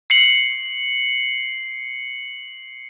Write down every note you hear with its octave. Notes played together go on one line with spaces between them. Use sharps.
C7 C#7 F#7